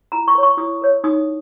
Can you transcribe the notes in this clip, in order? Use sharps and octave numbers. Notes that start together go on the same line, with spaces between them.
E4 A#5
C#6
A#4 C#5
C#6
E4 D#6
A#4 C#5
D#4 D#6